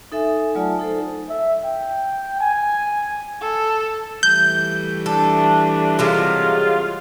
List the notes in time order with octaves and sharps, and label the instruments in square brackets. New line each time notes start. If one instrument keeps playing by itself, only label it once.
[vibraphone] D#4 A4 E5 G#5
F#3 A3 F4 D5 G#5 A5
D#4 A4 C5
[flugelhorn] E5
G5
G#5
[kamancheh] A4
[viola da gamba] E3 G3 A3 [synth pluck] G6
[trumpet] D4 [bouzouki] A4
[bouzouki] C3 F#3 G#3 [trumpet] F4